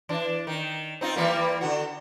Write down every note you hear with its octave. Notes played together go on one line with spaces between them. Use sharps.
E3 D4
D#3
C4 D#4 F4
E3 G3 A#3
D3 F#4